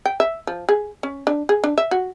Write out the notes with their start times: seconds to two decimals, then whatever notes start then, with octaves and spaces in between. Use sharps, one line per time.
0.06 G5
0.20 E5
0.47 F3
0.69 G#4
1.03 C#4
1.27 D4
1.49 G#4
1.64 D4
1.78 E5
1.91 F#4